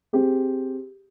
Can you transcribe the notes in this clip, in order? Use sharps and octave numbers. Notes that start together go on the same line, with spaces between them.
C4 G4 G#4